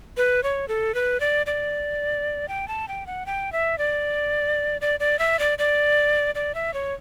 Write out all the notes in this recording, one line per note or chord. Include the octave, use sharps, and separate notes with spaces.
B4
C#5
A4
B4
D5
D5
G5
A5
G5
F#5
G5
E5
D5
D5
D5
E5
D5
D5
D5
E5
C#5